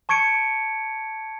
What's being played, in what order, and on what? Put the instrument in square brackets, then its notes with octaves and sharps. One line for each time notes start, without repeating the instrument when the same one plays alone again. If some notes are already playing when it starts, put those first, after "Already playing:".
[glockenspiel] A5 C#6 G#6 C#7 D7